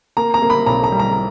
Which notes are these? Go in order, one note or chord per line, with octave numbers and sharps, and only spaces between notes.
A#3 A#5
A#5
A#3
B5
B1 A#5
A#5
G3
A#5